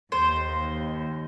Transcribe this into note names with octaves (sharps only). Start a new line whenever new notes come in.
D#2 C5